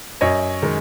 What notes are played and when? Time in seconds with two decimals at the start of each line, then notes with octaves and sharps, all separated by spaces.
0.21 F#2 C#5 D#5
0.62 D#3 G#3